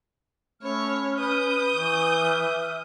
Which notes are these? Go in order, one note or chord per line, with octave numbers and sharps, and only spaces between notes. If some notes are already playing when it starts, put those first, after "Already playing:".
A3 C#4 C#5 B5 F6
B4 D#6 G6
E3 C#6
E5 E6 F6